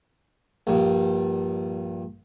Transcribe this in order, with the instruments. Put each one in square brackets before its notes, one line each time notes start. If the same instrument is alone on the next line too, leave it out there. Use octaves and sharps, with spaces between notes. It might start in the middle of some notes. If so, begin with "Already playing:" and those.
[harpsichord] A#1 G2